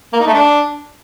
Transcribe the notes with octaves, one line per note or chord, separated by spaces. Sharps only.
A#3
D#4
A3
D4